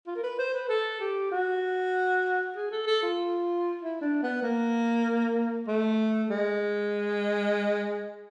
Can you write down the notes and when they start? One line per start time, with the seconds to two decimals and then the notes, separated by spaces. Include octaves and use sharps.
0.07 F4
0.16 A#4
0.23 B4
0.39 C5
0.54 B4
0.69 A4
1.01 G4
1.31 F#4
2.56 G#4
2.71 A4
2.87 A4
3.02 F4
3.81 E4
4.01 D4
4.23 B3
4.42 A#3
5.67 A3
6.30 G#3